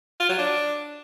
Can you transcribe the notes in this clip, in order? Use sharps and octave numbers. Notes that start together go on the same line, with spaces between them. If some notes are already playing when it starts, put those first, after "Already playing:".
F4
F#3
D4